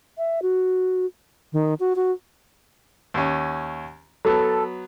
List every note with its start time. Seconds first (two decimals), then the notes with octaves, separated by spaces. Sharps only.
0.18 E5
0.42 F#4
1.53 D#3
1.80 F#4
1.96 F#4
3.14 D#2 C#4
4.25 F#3 B3 A4